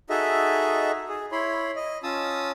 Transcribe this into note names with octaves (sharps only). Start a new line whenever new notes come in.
D#4 F#4 G#4 A4 D#5 E5
G#4
E4 C#5 B5 C6
D#5
C#4 F4 A5 D#6 E6